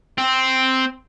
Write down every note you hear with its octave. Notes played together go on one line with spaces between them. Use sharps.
C4